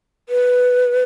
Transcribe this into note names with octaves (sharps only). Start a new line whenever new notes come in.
B4